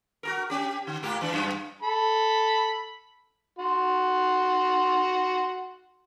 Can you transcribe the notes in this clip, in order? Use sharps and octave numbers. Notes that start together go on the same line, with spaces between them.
F#4 G#4 A#4
C#4 G4
D3
G#2 A#3 G4
E3 D4
F#2
A4 B5
F#4 C6